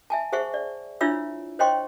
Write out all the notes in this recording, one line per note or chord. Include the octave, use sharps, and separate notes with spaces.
E5 G#5 A5
G#4 C5 E5 F#5 C#6
D5
D4 E4 F4 C#5 E5 E6
C5 C#5 D#5 G5 C6 C#6